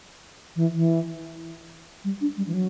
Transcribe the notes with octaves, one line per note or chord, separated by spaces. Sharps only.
E3
E3
G3
D4
G3
E3
F#3